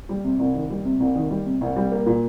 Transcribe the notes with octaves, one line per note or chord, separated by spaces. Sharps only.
G3
C3
C2
D#3
G3
C3
C2
D#3
G3
C3
C2
G3
A#3
A#2